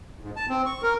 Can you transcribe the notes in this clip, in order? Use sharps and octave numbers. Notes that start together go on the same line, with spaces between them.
G#2
A5
C4
C#6
A#4